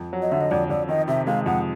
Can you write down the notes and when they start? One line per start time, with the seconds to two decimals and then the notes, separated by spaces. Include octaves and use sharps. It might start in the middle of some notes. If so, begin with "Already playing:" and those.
Already playing: F2
0.13 F#3
0.22 D#5
0.32 D3 E5
0.41 D#5
0.51 F2 D5
0.70 F2 D5
0.89 D#3 D#5
1.08 C3 E5
1.26 G#3 F5
1.46 F2 F#5